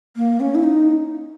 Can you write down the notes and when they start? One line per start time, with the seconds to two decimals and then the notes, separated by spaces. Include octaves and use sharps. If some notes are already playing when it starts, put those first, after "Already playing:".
0.17 A#3
0.40 C#4
0.55 E4
0.63 D#4